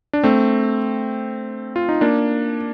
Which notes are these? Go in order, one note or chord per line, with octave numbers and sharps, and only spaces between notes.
D4
A3 C4
F4
D#4
A#3 D4